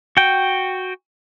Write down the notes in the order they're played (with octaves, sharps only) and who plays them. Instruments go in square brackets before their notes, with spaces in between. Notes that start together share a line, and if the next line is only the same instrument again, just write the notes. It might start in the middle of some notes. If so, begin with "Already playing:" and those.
[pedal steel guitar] F#4 G5